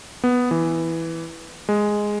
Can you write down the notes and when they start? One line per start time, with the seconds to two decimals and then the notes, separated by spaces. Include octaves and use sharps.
0.24 B3
0.51 E3
1.69 G#3